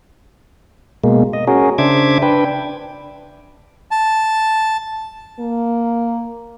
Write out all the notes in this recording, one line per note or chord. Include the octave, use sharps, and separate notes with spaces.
B2 G#3 A#3
D#5
C#4 F#4 G#4 A#4
C#3 D4 C5 E5 D6 G#6
D4 B4 G5
A5
A#3